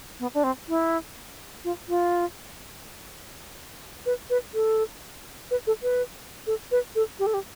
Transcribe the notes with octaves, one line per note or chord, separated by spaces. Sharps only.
B3
D4
C4
E4
F4
F4
B4
B4
A4
B4
A4
B4
A4
B4
A4
G4
A4
G4